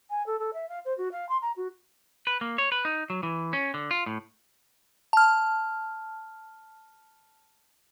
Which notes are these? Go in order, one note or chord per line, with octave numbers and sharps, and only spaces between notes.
G#5
A4
A4
E5
F5
C5
F#4
F5
C6
A#5
F#4
B4
A#3
C#5
B4
D#4
F#3
E3
C#4
D3
F4
A2
A5 F6